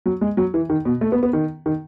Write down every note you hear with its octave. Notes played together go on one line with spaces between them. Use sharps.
F#3
G#3
F#3
E3
D#3
B2
A3
B3
B3
D#3
D#3